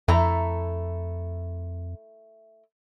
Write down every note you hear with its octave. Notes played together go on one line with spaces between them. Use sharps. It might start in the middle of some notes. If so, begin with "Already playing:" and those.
F2 A3 E4 A#5